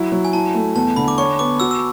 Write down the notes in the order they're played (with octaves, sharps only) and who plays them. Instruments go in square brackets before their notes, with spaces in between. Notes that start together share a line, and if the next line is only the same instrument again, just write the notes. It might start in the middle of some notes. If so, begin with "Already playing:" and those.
Already playing: [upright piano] F#3 E4
F#3
[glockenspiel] G#5
[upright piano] E4 [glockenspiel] A5
[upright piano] A3
[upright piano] E2 [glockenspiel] A5
[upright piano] D3 [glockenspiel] B5
[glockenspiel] D6
[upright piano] C#5 [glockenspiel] C#6
[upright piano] B3 [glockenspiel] D6
[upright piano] F#4 [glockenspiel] E6
[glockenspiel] E6